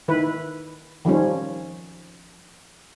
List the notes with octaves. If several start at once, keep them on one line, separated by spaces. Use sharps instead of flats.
D#3 E4 B4
D#3 F3 G3 C#4